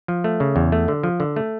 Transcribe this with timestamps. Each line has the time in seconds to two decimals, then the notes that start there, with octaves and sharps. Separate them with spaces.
0.08 F3
0.24 A3
0.40 C#3
0.56 E2
0.72 A3
0.88 D3
1.03 F3
1.20 D3
1.36 A3